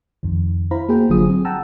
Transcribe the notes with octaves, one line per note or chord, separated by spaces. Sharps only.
F2 D#3
E4 C5 F5 A#5 B5
A#3 F#4 G#4 C5 G5
G1 D3 F#3 F4 G#4 D#6
F#3 C4 G#4
F#5 G5 A5 A#5 E6